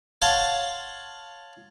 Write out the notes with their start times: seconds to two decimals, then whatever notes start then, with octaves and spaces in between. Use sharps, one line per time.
0.22 C#5 F5 F#5 A5 C6